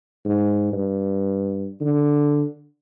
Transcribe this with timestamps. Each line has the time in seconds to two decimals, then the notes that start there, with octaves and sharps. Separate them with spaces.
0.25 G#2
0.72 G2
1.81 D3